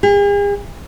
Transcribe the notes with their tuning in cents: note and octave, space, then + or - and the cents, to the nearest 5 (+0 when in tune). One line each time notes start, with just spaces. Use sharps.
G#4 -45